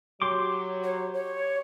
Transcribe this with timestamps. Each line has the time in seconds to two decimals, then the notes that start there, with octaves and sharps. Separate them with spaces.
0.22 F#3 G4 C6 D6
0.83 C#5
1.14 C#5